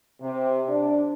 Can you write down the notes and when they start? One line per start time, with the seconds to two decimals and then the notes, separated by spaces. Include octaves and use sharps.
0.22 C3
0.68 D4